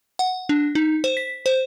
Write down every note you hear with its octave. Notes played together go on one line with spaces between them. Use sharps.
F#5
D4
D#4
C5
B6
C5